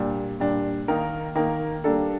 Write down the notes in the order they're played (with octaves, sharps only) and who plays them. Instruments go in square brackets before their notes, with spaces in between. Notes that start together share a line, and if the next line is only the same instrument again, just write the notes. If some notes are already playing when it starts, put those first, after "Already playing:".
Already playing: [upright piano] A#2 G3 D4
A#2 G3 D4
D#3 A#3 D#4 A#4
D#3 A#3 D#4 A#4
G3 A#3 D4 A4